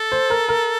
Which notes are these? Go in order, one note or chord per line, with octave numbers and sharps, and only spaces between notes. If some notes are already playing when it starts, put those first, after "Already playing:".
Already playing: A4
C5
A#4
A#4